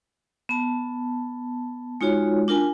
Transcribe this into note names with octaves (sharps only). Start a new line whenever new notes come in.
B3 A5
G#3 D#4 F4 F#4 C#5
D4 F4 A#4 G#5